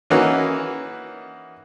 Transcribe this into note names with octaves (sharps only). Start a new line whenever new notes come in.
E3 A#3 C#4 D#4 F#4 B4